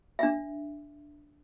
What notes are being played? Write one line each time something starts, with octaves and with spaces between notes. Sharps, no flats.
D4 E5